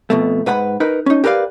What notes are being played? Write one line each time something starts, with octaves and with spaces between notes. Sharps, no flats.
F2 B2 A3
G#2 B4 F#5 B5
D#4 A#4 B4
C#4 D#4
G4 A#4 B4 D5 F5